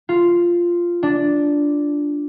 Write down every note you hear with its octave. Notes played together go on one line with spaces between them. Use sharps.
F4
D4